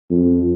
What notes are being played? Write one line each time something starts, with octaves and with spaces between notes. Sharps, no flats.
F2